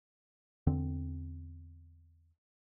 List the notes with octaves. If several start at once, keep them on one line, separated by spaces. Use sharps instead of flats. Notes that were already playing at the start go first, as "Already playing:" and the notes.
E2 D3 C4